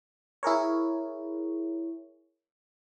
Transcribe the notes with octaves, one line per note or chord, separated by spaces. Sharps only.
E4 G#4 A#4 C#5